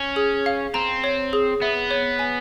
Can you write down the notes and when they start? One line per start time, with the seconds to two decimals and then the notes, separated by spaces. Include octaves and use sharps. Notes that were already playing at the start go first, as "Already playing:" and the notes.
Already playing: C#4
0.16 G#4
0.46 F5
0.74 C4 A#5
1.04 C#5
1.33 G#4
1.62 B3 E5
1.91 C#5
2.19 G#5